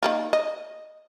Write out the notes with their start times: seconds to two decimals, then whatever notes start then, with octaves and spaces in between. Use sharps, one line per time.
0.03 D#3 A#3 F4
0.33 D#5